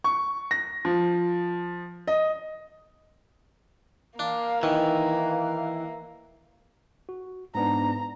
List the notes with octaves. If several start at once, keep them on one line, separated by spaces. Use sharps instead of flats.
C#6
A#6
F3
D#5
A#3 D4 F5
D#3 E3 D#4
F5
F#4
G#2 B3 D4 A#5